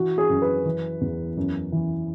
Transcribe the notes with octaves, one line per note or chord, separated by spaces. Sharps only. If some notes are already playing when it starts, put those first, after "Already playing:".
Already playing: E3 F#4
G#4
F#2
B4
E3
E2
F#2
E3